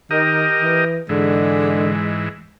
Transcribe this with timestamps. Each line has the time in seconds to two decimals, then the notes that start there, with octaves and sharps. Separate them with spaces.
0.11 D#3 G4 A#4 D#5
0.61 E3
1.09 G#2 D3 E3 G#3